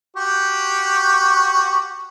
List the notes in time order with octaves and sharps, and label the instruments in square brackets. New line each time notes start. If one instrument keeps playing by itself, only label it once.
[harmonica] F#4 G4 C#6